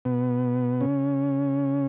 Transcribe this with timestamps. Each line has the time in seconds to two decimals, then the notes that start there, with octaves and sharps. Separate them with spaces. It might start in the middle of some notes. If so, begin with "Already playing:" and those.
0.05 B2 B3
0.81 C#3 C#4